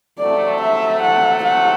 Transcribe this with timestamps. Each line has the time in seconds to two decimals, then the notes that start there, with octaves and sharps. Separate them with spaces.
0.19 C3 F#3 A3 D5
0.61 E5
1.01 F#5
1.44 F#5